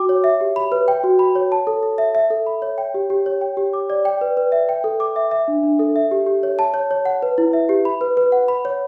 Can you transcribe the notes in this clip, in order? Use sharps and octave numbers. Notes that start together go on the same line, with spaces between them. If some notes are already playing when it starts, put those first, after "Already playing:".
Already playing: F#4 G5 D6
C#5
E5
G4
B5
B4
G5
F#4
B5
C#5
A5
A4
A4
E5
E5
A4
B5
C#5
G5
G4
G4
C#5
G5
G4
D6
D5
G5
B4
B4
E5
G5
A4
D6
E5
E5
D4
D4
A4
E5
G4
G4
C#5
A5
C#5
C#5
F#5
B4
E4
E5
G4
B5
B4
B4
F#5
B5
C#5